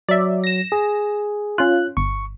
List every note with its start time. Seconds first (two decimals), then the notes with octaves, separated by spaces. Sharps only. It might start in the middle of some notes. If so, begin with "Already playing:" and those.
0.09 F#3 D5 E5
0.44 A#6 E7
0.72 G#4
1.58 C#4 F4 F#6
1.97 G1 C#6